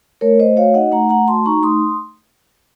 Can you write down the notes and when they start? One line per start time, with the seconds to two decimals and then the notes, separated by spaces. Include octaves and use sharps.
0.21 A3 A#4 C#5
0.39 A3 C5 D#5
0.57 F#4 C#5 F5
0.74 D#4 D#5 F#5
0.92 A3 F#5 A#5
1.09 A3 F#5 A#5
1.27 F#4 A5 C6
1.45 D#4 A#5 C#6
1.62 A3 C6 D#6